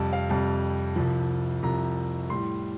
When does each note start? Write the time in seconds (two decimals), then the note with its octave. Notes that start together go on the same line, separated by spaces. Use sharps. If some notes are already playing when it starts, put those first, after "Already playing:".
Already playing: F2 C3 G3 A5
0.13 F5
0.29 F2 C3 G3 A5
0.96 C2 C3 F3
1.63 C2 C3 F3 A#5
2.29 A2 G3 C6